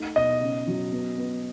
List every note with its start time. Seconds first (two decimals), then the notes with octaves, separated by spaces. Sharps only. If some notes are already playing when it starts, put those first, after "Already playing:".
Already playing: A3 D#4
0.16 B2 D#5
0.42 C#3
0.67 F#3
0.93 B3
1.18 B3